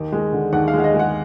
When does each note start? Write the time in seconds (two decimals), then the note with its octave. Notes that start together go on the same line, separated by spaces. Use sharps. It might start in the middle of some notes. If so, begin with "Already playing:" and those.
Already playing: D#2 D#3
0.12 G#3
0.32 D3
0.53 D#2 F#5
0.68 F5
0.73 G#3
0.80 F5
0.84 D#5
0.94 G#3
0.99 F#5